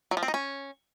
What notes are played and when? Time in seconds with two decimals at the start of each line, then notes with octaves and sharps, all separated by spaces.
0.11 F#3
0.17 F3
0.23 C4
0.28 D#4
0.34 C#4